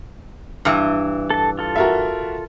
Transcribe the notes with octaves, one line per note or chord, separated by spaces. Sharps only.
G2 E3
A4 A5
F4 A4
F#4 A#4 E5